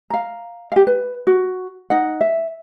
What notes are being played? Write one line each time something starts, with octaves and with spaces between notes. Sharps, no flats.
F5 A#5
G4 F5
B4
F#4
D#4 D#5 F#5
E5